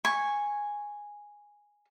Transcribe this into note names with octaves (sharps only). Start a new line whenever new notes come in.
G#5 C#6